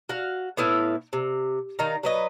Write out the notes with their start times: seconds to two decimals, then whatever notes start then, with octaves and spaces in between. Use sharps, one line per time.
0.09 F#4 F5
0.57 A2 B3 E4 F5
1.13 C3
1.79 D#3 D#4 F5 A#5
2.03 F#3 B4 D#5